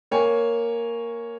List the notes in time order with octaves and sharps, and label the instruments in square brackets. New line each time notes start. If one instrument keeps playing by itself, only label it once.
[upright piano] A#3 C#5 G#5